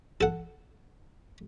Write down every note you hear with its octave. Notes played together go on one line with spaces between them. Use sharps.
A4 F#5